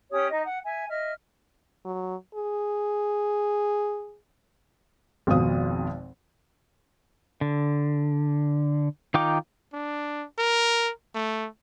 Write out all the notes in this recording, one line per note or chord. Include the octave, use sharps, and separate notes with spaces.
C#4 G4 C#5 D#6
D#4 D#5
F#5
E5 G#5
D#5 E5 F6
F#3
G#4
G#1 F2 B2 F5 D#6
D3
D#3 D#4 F4 G5 D6
D4
A#4
A3